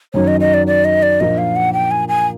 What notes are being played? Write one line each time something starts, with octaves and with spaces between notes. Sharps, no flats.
F#2 D#3 F#3 C#5
D#5
D#5
D5
D5
D#5
D5
A#2 F3 A#3 D4 D#5
F5
F#5
G5
G#5
G#5